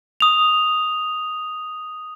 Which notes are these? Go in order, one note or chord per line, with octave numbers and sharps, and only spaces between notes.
D#6 F7